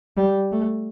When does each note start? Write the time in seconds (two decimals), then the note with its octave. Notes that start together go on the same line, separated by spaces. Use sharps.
0.17 G3
0.52 A3